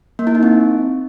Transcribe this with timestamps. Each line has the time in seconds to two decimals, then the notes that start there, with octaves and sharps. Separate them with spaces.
0.19 A#3
0.27 E4
0.35 D#4
0.43 C4